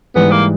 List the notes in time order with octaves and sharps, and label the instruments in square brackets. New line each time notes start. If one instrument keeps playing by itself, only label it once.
[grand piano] G#2 E3 G3 [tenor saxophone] B3
[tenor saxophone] A#3